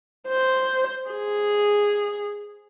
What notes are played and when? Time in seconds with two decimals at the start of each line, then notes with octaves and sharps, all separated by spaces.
0.29 C5
1.11 G#4